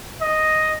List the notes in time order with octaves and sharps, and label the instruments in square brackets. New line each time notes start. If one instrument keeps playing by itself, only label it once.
[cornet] D#5